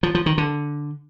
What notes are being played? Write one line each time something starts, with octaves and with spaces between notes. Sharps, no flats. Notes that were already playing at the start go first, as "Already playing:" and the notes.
F3
F3
D#3
D3